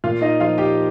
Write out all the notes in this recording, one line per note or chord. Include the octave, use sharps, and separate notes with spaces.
A#2 F4 F5
D#4 D#5
F3 F4 F5
G4 G5